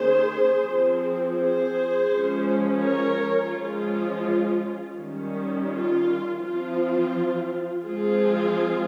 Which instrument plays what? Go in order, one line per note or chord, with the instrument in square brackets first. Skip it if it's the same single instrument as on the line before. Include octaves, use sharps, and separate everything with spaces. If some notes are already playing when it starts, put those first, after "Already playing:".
Already playing: [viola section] D#3 A#3 C#4 G#4 C5
F3 C4
G#4 C5
F3 G#3 C#4
A#4 C#5
F3 G#3 C#4 F4
D#3 G3 C#4
F4
F3 C4 F4
F3 G#3 C4 F4 G#4